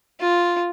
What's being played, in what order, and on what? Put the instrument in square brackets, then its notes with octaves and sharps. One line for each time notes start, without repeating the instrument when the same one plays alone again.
[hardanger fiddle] F4